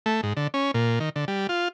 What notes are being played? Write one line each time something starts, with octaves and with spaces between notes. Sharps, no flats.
A3
G#2
D3
C#4
A#2
D#3
D3
G3
F4